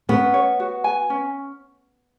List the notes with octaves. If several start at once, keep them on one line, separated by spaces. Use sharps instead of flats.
B3 C#4
C#5
F#4
G#5
C#4